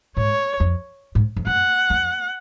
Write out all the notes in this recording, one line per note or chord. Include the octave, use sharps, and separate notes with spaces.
G#2 C#5
F2
G#2
F2
F#2 F#5
F2